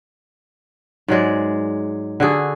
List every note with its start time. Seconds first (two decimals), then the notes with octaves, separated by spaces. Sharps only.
1.08 G#2 F#3 G#3 D5
2.20 D3 F#4 G#4 A4